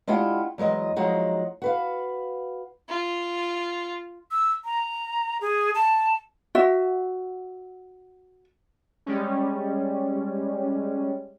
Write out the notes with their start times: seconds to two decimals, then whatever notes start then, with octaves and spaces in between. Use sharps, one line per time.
0.07 G#3 D4 E4 F4 G4 F#5
0.58 E2 F#3 G#3 D#5
0.96 F3 F#3 G#3 D#4 F#4
1.62 F#4 B4 F5
2.89 F4
4.31 E6
4.65 A#5
5.41 G#4
5.75 A5
6.55 F#4 E5
9.06 G3 G#3 C#4